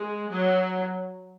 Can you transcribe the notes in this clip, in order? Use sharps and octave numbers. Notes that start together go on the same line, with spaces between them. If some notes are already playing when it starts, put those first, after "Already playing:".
Already playing: G#3
F#3